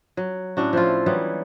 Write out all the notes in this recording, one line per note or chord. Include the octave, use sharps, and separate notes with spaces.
F#3
A2 C#4 D4 F#4
F3 E4 F4
E3 F#3 G3 B3